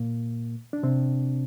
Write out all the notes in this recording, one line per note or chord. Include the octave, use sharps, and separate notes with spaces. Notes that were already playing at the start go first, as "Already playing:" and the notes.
Already playing: A#2 A#3
D4
C3 C4